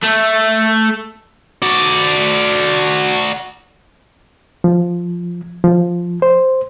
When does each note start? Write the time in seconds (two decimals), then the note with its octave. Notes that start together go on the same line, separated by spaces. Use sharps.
0.04 A3
1.62 F#4 D5
4.64 F3
5.64 F3
6.22 C5